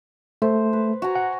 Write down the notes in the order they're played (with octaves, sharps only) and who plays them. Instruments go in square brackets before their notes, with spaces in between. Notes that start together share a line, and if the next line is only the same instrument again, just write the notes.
[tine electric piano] A3 [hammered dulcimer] C5
[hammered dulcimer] B4
F#4 G#5 A#5
[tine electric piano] F#5